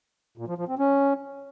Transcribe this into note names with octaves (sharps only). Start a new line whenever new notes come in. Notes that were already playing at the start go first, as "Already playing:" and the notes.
A#2
F3
F3
C4
C#4